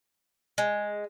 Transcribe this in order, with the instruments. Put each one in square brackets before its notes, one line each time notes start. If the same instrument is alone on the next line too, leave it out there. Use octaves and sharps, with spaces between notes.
[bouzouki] G#3